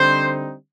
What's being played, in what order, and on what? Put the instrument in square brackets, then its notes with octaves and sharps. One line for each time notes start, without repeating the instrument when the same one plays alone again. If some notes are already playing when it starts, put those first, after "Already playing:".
Already playing: [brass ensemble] D3 G3 C4 D#4 C5